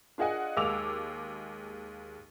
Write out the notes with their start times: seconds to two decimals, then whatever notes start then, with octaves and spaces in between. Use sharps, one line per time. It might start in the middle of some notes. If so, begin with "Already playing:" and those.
0.18 D4 F4 G#4 D#5 F#5 G#5
0.57 D#2 G#3 F5 D6 E6 F7